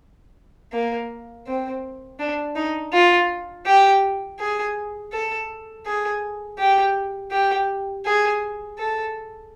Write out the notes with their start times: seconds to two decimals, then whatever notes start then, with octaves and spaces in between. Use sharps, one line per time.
0.72 A#3
1.47 C4
2.19 D4
2.56 D#4
2.93 F4
3.66 G4
4.39 G#4
5.12 A4
5.85 G#4
6.59 G4
7.31 G4
8.05 G#4
8.78 A4